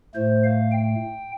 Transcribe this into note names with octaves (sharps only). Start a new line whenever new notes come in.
A2 A3 C5
F5
G5